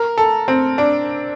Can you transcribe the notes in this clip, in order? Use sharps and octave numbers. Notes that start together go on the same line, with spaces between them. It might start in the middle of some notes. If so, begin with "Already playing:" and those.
Already playing: A#4
A4
C4
D4